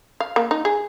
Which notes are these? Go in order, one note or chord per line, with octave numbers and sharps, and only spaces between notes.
F5
A#3
D#4
G#4